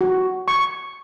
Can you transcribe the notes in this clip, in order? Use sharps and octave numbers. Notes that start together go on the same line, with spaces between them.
F#4
C#6